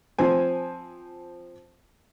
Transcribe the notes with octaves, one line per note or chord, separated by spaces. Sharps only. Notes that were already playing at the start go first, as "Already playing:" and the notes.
F3 C4 C5 G#5